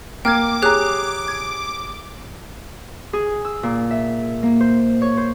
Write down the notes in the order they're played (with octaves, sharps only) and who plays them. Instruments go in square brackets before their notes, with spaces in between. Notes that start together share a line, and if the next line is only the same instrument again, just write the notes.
[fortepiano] A#3 [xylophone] G5 F6 G#6 [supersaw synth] D6
[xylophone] G4 C#5 F#6 [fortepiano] G#4 A#5
[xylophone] G#6
[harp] G#4
E6
A#2
E5
A#3
C5
C#5
C5